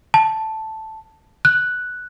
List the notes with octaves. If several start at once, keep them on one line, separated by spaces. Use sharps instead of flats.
A5
F#6